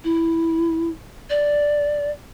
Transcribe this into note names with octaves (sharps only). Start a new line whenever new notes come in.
E4
D5